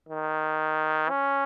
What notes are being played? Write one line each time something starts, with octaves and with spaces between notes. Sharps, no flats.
D#3
C#4